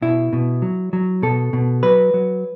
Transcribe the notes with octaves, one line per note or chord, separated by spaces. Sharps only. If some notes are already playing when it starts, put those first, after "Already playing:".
B2 E4
B2
F#3
F#3
B2 A4
B2
F#3 B4
F#3